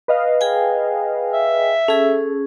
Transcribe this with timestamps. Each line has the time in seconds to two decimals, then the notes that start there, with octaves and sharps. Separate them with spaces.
0.08 B4 D#5 F5
0.41 G#4 G5 G#5
1.33 E5
1.88 C#4 G#4 A4